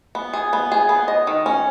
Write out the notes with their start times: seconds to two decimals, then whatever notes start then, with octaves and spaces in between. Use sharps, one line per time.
0.15 B3
0.33 G#4
0.53 B3
0.72 G#4
0.89 B3
1.08 D#5
1.27 D#3
1.46 C#4